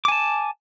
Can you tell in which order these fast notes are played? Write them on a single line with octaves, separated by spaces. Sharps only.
D6 G#5 A5